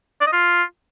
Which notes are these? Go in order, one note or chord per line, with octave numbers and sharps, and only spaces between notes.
D5
D#5
F4